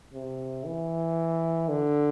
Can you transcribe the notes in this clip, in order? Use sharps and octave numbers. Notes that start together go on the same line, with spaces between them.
C3
E3
D3